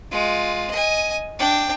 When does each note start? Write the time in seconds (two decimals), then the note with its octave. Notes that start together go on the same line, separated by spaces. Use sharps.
0.11 G#3 F4
0.71 D#5 G#5
1.39 D4 G5